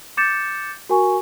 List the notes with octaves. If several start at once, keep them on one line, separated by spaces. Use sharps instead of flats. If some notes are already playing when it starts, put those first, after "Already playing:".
D6 G6 A6 C#7 E7
F#4 A#4 G#5 C#6